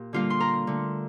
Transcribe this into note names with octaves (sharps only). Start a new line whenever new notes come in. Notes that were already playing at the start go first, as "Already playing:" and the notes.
Already playing: A#2 G4
D3 G3 A#3 F4 F5
C6
A#4 A#5
D3 A3